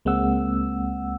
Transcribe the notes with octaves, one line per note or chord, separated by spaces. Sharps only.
C#2 G#3 A#3 C4 F#5 E6